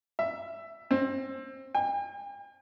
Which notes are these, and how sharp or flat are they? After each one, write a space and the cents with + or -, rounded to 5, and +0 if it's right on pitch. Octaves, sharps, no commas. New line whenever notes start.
E5 +10
C4 +25
G5 +45